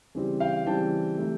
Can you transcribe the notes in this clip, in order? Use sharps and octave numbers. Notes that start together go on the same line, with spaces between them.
C#3 E3 G3 C4
F5 G5
C#3 E3 G3 C4 G5 A5
C3 E3 A3